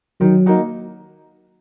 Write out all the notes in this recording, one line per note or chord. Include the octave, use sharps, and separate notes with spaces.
D#3 F#3
A#3 D#4 F#4